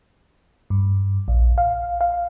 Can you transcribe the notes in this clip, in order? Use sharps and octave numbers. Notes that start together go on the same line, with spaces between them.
G2
A#1
F5
F5